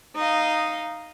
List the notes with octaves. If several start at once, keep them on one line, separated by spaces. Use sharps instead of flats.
D#4 D#5 F5